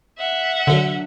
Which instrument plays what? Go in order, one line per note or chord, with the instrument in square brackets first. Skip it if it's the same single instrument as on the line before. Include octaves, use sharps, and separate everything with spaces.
[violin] E5 F#5
[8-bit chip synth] D3 A4 [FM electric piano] F#3 D4